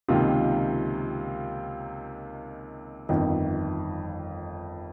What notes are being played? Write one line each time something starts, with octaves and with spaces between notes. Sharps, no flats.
C#2 C3 D#3 A#3 F4
G1 F2 D#3